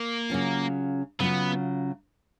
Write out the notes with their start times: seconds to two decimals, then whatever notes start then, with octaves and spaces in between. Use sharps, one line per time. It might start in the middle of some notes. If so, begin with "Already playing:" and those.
Already playing: A#3
0.30 C#3 F#3 C#4 F4
1.20 C#3 F#3 B3 C#4 F4